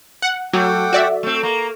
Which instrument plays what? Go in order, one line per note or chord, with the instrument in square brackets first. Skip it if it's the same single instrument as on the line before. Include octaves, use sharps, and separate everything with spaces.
[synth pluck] F#5
[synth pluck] F#3 [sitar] A3 [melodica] F#5 G5 D6
[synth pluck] F#4 D5 E5
[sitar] A3 C4
[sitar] A#3 [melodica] A#5